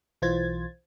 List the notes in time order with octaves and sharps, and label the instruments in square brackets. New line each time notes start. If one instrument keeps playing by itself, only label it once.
[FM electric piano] B1 E3 F4 C5 G#6 A6